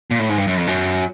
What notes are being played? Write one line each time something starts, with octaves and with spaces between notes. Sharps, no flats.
A#2
A2
G#2
G2
F#2
F2
F#2